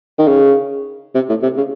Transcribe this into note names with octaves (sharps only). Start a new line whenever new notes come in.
D#3
C#3
C3
A2
C3
C#3